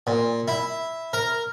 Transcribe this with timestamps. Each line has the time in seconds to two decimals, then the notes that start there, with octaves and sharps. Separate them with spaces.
0.07 A#2
0.48 E4
1.13 A#4